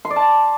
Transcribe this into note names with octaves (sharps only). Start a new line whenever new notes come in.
C6
D5
A5